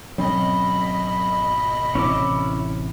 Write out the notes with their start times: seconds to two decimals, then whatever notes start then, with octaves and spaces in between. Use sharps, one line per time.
0.18 G#1 B2 F#3 C4 C#4 D#5 B5
1.95 A1 C3 C#4 E4 D6